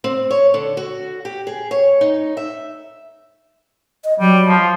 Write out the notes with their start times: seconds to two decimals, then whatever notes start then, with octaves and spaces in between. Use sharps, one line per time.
0.04 C4
0.31 C#5
0.54 D3
0.77 F#4
1.25 G4
1.47 G#4
1.71 C#5
2.01 D#4
2.37 E5
4.04 D#5
4.20 F#3 G3
4.48 F3